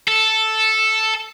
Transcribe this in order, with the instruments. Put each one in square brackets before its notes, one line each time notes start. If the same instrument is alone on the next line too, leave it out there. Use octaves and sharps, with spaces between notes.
[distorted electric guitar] A4